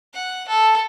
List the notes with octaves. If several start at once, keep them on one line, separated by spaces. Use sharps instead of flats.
F#5
A4